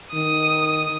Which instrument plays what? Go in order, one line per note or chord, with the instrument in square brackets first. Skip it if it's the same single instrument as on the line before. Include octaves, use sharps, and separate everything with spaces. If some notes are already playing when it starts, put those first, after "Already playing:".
[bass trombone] D#3 [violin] D#6